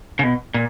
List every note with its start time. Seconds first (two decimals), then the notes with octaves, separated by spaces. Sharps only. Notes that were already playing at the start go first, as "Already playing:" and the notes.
0.19 C#3
0.23 B2
0.54 A#2